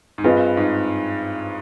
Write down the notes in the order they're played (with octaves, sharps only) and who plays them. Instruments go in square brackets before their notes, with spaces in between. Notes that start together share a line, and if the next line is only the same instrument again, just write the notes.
[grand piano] G#2
[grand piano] G2 [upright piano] C4 F4 G#4 B4 D#5
[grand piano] G#2